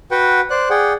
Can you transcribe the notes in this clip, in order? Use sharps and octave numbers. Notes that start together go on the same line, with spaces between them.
F#4 B4 F#5 G5
C5 D5 F#6
G#4 D5 F#5 G5